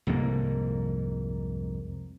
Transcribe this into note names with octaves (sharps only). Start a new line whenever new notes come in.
C2 F2 G#2 A#3